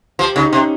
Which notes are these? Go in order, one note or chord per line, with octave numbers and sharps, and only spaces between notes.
F3 G4
C#3 D#4
C3 C#4